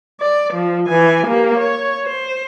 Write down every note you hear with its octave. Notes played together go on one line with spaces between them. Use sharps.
D5
F3
E3 G#5
A#3 G4
C#5
C5